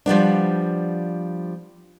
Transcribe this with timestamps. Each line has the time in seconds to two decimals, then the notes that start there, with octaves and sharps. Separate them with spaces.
0.06 F3 G3 B3 D4